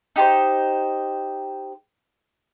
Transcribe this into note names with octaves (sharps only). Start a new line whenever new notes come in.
D#4 G4 B4 C5